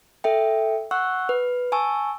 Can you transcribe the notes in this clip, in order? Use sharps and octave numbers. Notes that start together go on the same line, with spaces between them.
A4 E5 G5
F#5 C#6 E6 F#6
B4
G#5 A5 C#6 E6